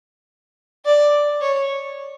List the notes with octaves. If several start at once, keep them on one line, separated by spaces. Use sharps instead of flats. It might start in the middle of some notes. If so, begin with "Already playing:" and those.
D5
C#5